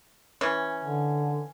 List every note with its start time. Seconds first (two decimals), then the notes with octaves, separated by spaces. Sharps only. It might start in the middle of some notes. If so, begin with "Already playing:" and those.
0.41 E3 C#4
0.84 D3